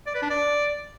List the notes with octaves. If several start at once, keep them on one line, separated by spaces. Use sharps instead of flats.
D5
B4
D4
D5